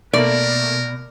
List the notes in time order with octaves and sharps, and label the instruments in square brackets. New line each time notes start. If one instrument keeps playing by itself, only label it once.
[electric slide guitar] B2 [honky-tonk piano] A3 A#3 [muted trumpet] A#4 [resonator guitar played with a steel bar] D5